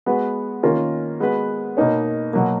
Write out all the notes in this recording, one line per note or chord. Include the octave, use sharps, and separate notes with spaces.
G#3 B3 F#4 B4
D#3 A#3 C#4 F4 A#4
G#3 B3 F#4 B4
B2 A#3 D#4 A#4 C#5
B2 F#3 A#3